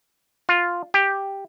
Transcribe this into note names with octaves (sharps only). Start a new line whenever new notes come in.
F4
G4